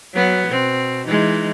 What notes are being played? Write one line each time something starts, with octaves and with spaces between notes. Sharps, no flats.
F#3 B3
B2 C4
E3 G#3 D#4